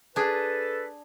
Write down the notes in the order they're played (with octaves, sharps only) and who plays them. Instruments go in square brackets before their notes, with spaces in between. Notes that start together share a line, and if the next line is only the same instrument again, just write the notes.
[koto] D4 G#4 [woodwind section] A4 B4 A5